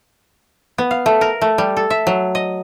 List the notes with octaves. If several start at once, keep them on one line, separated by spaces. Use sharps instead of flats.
B3
F5
A3
A#4
A3
G3
A4
E5
F#3
D#5